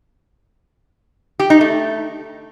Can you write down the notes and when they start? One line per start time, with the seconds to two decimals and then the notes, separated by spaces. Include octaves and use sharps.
1.40 G4
1.50 D#4
1.61 A3